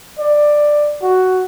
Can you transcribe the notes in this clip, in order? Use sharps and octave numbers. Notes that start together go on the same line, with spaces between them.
D5
F#4